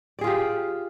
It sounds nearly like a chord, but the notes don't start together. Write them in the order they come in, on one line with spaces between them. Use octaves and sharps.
D5 G#4 F4 G4